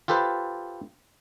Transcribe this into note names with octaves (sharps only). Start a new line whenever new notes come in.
F4 G4 A4 B4 C5